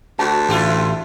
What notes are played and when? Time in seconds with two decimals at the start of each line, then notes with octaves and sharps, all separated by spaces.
0.19 D2 F#4 A5
0.49 A1 E4 F4 G4